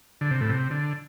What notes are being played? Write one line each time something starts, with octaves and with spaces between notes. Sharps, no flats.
D3
C3
A2
C3
D3